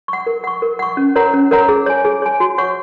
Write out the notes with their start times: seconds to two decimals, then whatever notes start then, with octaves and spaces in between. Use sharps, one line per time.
0.08 F#5 C#6
0.26 A#4
0.44 F#5 C#6
0.62 A#4
0.79 F#5 C#6
0.97 C#4
1.16 A#4 C#5 F#5 A#5
1.34 C#4
1.51 A#4 C#5 F#5 A#5
1.69 G#4
1.86 C#5 G#5
2.05 G#4
2.22 C#5 G#5
2.40 F#4
2.58 C#5 F#5 C#6